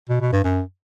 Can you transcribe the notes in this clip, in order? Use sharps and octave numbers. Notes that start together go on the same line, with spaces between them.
B2
B2
G2
F#2